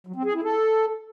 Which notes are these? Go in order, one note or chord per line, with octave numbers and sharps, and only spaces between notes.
F#3
C4
G#4
E4
A4